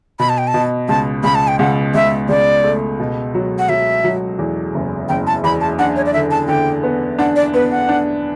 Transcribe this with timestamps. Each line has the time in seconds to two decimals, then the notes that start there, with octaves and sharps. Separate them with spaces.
0.19 B2 B5
0.29 A5
0.38 G5
0.48 A5
0.54 B2
0.88 C#2 A5
1.24 C#2 B5
1.35 A5
1.48 G5
1.59 C#2 F#5
1.94 C#2 E5
2.29 C#2 D5
2.64 A3
3.00 B2
3.34 F#3
3.59 F#5
3.69 F#3 E5
4.04 F#3
4.39 E2
4.74 F#1
5.09 F#1 G5
5.27 A5
5.43 E2 B5
5.61 A5
5.79 D4 F#5
5.96 C#5
6.06 D5
6.14 D3 E5
6.31 A5
6.48 D3 G5
6.83 B3
7.19 D4 F#5
7.36 D5
7.53 B3 B4
7.71 F#5
7.89 D4